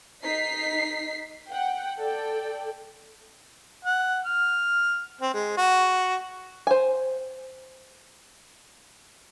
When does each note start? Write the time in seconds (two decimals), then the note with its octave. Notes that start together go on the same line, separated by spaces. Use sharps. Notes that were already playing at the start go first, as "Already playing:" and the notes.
0.24 D#4 B6 C7
1.49 F#5 G5
1.99 A4 D5 G5
3.85 F#5
4.25 F6
5.21 C4
5.34 G#3
5.57 F#4
6.67 C5 G#5